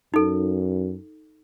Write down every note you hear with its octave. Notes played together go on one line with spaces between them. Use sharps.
F#2 D#4 A4